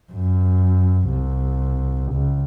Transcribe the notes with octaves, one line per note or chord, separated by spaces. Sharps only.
F#2
C2
C#2